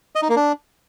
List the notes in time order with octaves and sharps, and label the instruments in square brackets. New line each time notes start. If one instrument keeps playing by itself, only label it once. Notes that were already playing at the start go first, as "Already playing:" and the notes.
[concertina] D#5
D#4
A#3
D4